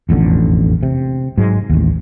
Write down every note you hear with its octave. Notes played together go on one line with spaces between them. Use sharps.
E1 A1 F2 D3
C3
G#2 F#3 G#3
A1 D#2